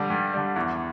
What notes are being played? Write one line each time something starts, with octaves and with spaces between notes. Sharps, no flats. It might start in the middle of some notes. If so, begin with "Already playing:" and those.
Already playing: G2 D3 G3 D5
G2
D3 G3
E2